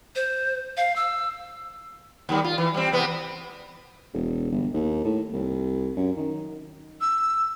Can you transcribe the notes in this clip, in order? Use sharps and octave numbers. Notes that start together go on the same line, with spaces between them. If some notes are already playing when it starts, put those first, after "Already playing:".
C5
F5
E6
D#2 D#3 G3
F4
E3
G3 C4
E2 C3 B3
E1
G1
D#2
A2
C2
F#2
D#3
E6